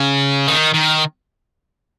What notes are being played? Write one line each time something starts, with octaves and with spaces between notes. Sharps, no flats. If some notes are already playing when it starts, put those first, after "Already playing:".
Already playing: C#3
D#3
D#3